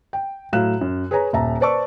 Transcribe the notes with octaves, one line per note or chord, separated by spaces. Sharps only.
G5
A2 F#3 F5 F#6 E7
F#2
G#4 B4 C#5 G#5 A#5
D#1 E5 A5 A#5
B4 C5 D5 A5 C#6 E6